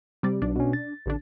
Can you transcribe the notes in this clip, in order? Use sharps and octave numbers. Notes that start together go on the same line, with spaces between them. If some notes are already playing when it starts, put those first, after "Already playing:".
C3 G3 D5
B1 B2 D4
B2 C#4
A6
A1 D3 D4